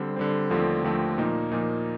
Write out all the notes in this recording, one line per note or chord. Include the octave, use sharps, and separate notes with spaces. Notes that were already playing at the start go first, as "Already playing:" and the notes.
Already playing: D3 G3 C4
D3 G3 C4
D#2 D3 F3 A3 C4
D#2 D3 F3 A3 C4
A#2 F3 A#3 D#4
A#2 F3 A#3 D#4